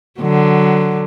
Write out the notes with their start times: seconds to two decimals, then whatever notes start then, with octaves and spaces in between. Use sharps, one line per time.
0.20 D3 F#3